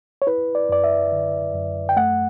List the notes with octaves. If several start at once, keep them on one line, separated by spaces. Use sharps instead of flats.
C#5
E4 B4
D5
F#2 D5
E5
D3
F#2
G5
A3 F#5